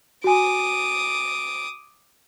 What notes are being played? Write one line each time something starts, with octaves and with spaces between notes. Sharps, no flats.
F#4 G#5 D6 D#6